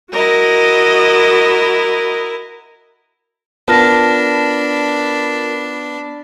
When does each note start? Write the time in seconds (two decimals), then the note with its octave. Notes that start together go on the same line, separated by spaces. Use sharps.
0.12 E4 F#4 A#4 D#5
3.68 B3 D4 F4 A#4 A5 B5 F6 A#6